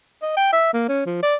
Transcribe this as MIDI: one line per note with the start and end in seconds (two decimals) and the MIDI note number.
0.22 0.32 75
0.37 0.49 79
0.53 0.73 76
0.73 0.84 58
0.88 1.03 61
1.06 1.21 53
1.23 1.35 74